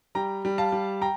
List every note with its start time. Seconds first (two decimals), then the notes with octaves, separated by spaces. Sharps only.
0.15 G3 G5 A#5
0.45 G3
0.58 F5 A5
0.72 G3
1.02 G5 A#5